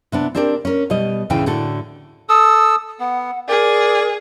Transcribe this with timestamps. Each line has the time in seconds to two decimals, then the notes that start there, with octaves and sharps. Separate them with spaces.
0.12 C3 B3 D4
0.35 C4 D4 G4 A#4 D5
0.65 C#4 A#4
0.90 B2 G3 D#5
1.30 D2 A2 C#3 E3 G5
1.46 A2 D3 F#4 A4
2.29 A4 D#6 E6
3.00 B3 F#5
3.48 G#4 A#4 D5